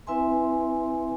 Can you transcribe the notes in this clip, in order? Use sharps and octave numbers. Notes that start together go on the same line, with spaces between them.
C4 E4 B4 E5 G#5 C6